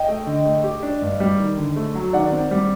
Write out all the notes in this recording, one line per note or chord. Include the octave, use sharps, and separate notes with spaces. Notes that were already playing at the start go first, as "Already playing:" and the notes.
Already playing: D#5 G5
A3
D3
A3
G4
D4
G2
G3
D#3
D3
A3
F#3
D#3 D5 F#5
C4
G3